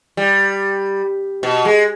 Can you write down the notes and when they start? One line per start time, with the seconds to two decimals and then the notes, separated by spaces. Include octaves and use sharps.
0.17 G3
1.43 B2
1.65 G#3